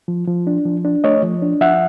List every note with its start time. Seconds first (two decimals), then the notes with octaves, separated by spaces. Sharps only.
0.08 F3
0.28 F3
0.47 D4
0.65 F3
0.85 D4
1.04 A3 C#5 D#5
1.23 F3
1.42 D4
1.61 F3 E5 F#5